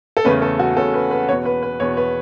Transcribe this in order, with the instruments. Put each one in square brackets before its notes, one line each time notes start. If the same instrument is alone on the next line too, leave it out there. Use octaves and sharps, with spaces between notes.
[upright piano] A4
E2 C#3 A3 C#4 B4
A4
F#4
E2 C#3 A3 C#4 A4
B4
B4
E2 B2 B3 C#5
B4
B4
E2 B2 B3 C#5
B4